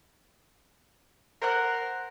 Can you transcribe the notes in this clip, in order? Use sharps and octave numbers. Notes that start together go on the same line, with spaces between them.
A#4 C5 F#5 F#6